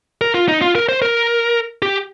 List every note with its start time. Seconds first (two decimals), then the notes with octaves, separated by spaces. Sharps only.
0.21 A#4
0.34 F4
0.48 D#4
0.62 F4
0.75 A#4
0.89 C5
1.02 A#4
1.82 G4